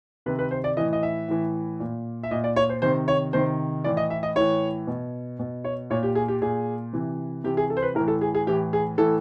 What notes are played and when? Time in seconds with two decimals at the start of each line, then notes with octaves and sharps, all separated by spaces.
0.26 C3 D#3 B4
0.39 B4
0.51 C5
0.64 D5
0.77 A2 E3 D#5
0.93 D#5
1.03 E5
1.28 A2 E3
1.80 A#2
2.23 E5
2.31 A#2 D#5
2.44 D5
2.56 C#5
2.69 C5
2.82 C3 D#3 C5
3.08 C#5
3.33 C3 D#3 C5
3.84 A2 E3 D5
3.97 D#5
4.10 E5
4.23 D#5
4.36 A2 E3 C#5
4.87 B2
5.39 B2
5.64 C#5
5.90 A#2 C#5
6.03 G4
6.15 G#4
6.28 G4
6.42 A#2 G#4
6.93 C3 E3
7.44 C3 E3 G4
7.57 G#4
7.70 A4
7.77 C5
7.82 B4
7.95 A2 A#4
7.99 E3
8.08 A4
8.21 G#4
8.35 G#4
8.47 A2 E3 G4
8.73 G#4
8.98 A2 E3 A4